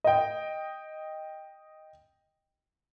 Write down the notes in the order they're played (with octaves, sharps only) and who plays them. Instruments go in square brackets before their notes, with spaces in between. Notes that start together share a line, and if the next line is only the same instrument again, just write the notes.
[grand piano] D#5 G5